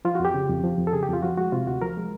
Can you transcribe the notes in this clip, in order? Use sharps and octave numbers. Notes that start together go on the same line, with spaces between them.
F3 F4
F2 F#4
G4
C#3
F2
F3
F2
A4
C#3 G#4
G4
F2
F4
F3 F#4
G#3 F#4
C3 F4
D2 F#4
F3 A#4
G#3